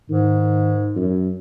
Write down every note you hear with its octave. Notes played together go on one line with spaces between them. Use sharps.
G#2 D#3
F#2